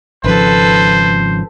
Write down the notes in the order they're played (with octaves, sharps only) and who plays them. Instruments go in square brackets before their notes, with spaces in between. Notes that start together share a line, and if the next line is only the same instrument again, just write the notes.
[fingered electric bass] G#1 C#3 F3 [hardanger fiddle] A4 B4 [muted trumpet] C5